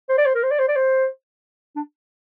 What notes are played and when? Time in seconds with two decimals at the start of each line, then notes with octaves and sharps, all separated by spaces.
0.09 C5
0.18 D5
0.26 C5
0.35 A#4
0.43 C5
0.51 D5
0.59 C5
0.68 D5
0.76 C5
1.76 D4